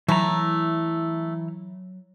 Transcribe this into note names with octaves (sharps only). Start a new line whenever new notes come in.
E3 F#3 A3 E4 A#5